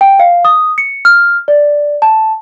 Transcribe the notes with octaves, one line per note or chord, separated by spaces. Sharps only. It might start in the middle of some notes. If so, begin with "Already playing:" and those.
G5
F5
D#6
C#7
F6
D5
A5